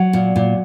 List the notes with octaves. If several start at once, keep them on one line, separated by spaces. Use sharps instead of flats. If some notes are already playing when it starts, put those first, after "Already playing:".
Already playing: F#3
A#2
A#2